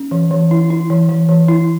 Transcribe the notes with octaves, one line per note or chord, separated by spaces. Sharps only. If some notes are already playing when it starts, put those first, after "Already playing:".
Already playing: C#4
E3
E3
E4
E4
E3
E3
E3
E4